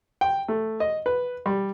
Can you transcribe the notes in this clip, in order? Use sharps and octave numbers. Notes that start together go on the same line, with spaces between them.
G5
A3
D#5
B4
G3